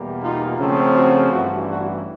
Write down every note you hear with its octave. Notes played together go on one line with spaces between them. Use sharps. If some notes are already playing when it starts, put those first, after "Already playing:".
Already playing: E2 B2 G3 A#3
D#4 F4
F#2 C#3 F3 A3 C4
F#4 G#4
A1 G2 E3 G3 E4 F#4
E4 F#4